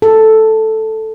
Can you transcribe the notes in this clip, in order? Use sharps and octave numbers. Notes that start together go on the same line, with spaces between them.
A4